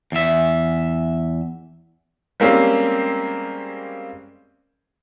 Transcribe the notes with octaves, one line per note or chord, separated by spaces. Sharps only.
E2 E5
G3 G#3 A#3 C4 C#4 G4